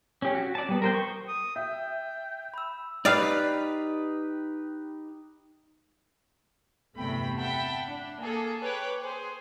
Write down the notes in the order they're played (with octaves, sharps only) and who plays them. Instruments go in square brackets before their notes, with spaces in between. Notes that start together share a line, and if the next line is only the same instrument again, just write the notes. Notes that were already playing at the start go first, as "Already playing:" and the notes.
[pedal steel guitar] C#4 G4
F#4
D5 A5
G3 B3
A#4 C5 G5
C#6
[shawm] D#6
[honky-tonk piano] E5 [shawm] G5
[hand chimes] B5 E6
[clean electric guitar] D#4 G4 B4 [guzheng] D5 F5
[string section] G1 E2 C3 A3 G5 B5
E5 F#5 G5 A5 B5
D4
A#3 G#4 A4
B4 C#5 G5 D6 F#6
G#4 C5